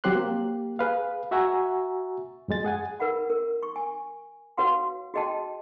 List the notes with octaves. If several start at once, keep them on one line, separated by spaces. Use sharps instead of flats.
F#3 C4 G4 C5 C6 F#6
A#3 G4
G#4 B4 F5
F#4 E5 F#5 G#5 A#5 C#6
F#2 F#3 G#3 A6
G#4 F#5 G#5
A#4 B4 E5 F#5 B5
A#4
C#6
G#5
F#4 B4 C#5 F5 F#5 C6
F#4 G#4 D#5 G5 A5